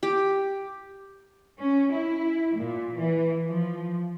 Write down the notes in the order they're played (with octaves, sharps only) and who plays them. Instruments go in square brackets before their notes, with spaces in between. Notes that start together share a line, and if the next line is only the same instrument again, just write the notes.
[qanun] G4
[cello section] C#4
E4
A#2
E3
F3